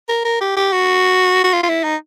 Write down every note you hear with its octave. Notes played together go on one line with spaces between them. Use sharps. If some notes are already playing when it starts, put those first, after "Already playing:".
A#4
A#4
G4
G4
F#4
F#4
F4
F4
E4
D#4